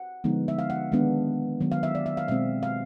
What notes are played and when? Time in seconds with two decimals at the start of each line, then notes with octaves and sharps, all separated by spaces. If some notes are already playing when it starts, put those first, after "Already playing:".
Already playing: F#5
0.24 D3 F3 G#3 B3 D#4
0.48 E5
0.59 F5
0.70 F#5
0.92 D#3 G#3 B3 D4
1.60 D#3 F#3 B3
1.72 F5
1.83 E5
1.95 D5
2.06 E5
2.17 F5
2.28 B2 G#3 C4 E5
2.63 F5